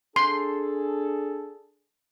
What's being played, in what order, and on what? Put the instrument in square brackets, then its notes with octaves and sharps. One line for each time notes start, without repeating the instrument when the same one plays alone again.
[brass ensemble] D4 G#4 A4 [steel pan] C6